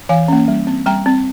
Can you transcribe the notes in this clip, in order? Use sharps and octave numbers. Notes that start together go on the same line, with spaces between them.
E3 F5 G#5
A#3 C#4
G3
C4
G3 G5 A#5
C4